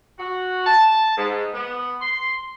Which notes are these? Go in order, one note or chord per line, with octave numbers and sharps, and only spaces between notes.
F#4
A5
G#2
B3
C6